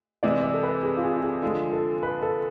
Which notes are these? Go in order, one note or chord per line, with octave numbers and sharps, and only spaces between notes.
C3 E3 G#3 D5
D5
A4
B4
G#4
F4
G#4
F4
G#4
D3 F3 G#3 F4
A4
B4
A4